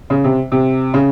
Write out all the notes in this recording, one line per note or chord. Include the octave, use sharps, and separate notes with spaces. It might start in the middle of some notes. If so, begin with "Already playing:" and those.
C#3
C3
C3
C#3